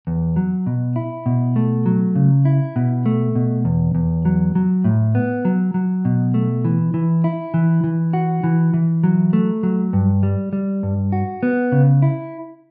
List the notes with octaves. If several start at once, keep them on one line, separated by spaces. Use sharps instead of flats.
E2
F#3
B2
E4
B2
A3
F#3
C#3
E4
B2
A3
B2
E2
E2
F#3
F#3
A2
B3
F#3
F#3
B2
A3
E3
E3
E4
E3
E3
F#4
E3
E3
F#3
A3
F#3
G2
G3
G3
G2
F#4
B3
C#3
E4